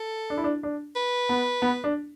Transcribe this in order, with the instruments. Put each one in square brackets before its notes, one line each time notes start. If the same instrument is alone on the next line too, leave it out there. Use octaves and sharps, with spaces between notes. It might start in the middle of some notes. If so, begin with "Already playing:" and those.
Already playing: [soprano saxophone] A4
[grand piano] D4
E4
D4
D4
[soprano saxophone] B4
[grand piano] B3
B3
D4